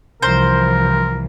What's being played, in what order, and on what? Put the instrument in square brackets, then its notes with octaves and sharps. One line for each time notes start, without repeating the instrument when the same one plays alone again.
[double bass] C2 [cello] E3 F3 [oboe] A#4 [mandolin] C5